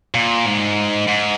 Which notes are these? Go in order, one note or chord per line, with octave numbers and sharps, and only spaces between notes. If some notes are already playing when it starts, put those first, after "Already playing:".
A#2
G#2
G#2